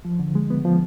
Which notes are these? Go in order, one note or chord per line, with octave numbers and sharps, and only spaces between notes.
F3
D3
G#3
B3
F3